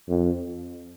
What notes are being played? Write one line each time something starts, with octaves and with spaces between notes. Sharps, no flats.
F2